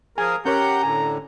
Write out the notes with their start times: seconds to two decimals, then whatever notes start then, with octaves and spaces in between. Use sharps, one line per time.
0.18 F3 G#4 A#4 G#5
0.45 C#4 G4 A#4 C#5 F#5 A#5 G6
0.83 A2 D3 G#5